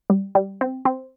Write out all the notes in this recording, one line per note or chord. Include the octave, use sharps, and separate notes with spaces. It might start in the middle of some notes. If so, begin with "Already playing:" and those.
G3
G3
C4
C4